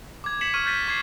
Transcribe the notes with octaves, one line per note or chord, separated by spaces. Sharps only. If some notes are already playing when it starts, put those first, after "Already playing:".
D6 G#6
B6 C#7 E7 F#7
C#6 F6 G#6 D#7
G6 A6 B6 D#7
C#6 G#6 C7